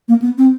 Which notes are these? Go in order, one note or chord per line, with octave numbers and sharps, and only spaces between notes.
A#3
B3
C4